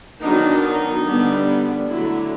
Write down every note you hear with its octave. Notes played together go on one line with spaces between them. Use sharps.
D#3 F#3 B3 D4 D#4
D#4
D3 G3 B3 D4
D3 F#3 A3 E4